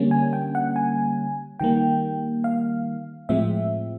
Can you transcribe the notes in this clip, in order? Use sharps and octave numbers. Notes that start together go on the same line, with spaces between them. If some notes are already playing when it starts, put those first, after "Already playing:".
Already playing: D3 G3 A#3 C#4
G#5
G5
F#5
G#5
D#3 G3 A#3 G5
F5
A2 F3 G#3 C4 E5